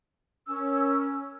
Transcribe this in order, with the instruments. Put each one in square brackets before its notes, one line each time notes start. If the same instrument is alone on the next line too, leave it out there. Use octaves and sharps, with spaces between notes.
[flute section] C#4 A#4 E6